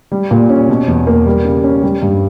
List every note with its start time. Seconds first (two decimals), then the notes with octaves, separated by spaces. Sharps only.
0.12 G3
0.31 A#2
0.49 C#4
0.69 B2
0.88 E2
1.07 A#3
1.26 G3
1.45 C#3
1.64 C#4
1.83 G3
2.02 G2